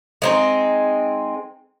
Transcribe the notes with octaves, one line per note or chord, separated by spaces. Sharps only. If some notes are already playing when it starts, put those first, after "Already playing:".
G#3 C4 D#4